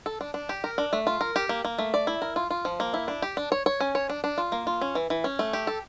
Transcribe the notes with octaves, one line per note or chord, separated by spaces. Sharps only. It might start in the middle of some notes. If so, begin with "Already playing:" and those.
A4
D4
D4
G4
A#4
D4
A3
F4
A#4
G4
A#3
A#3
A3
D5
E4
A#4
F4
F4
F3
A#3
E4
D4
G4
D4
C#5
C#5
C#4
C#5
D4
D4
F4
A#3
F4
C#4
E3
E3
C#4
A3
G4
A4